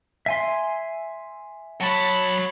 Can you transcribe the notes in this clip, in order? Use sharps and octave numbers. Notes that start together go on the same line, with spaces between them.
E5 G#5 C6
F#3 C#5 F#5 A5 B5